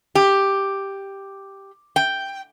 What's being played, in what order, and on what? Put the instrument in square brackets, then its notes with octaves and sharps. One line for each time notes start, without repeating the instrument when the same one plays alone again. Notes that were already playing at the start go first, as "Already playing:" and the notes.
[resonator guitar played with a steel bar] G4
G5